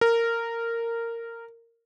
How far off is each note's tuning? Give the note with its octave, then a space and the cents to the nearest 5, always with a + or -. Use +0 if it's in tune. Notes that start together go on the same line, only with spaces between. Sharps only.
A#4 -15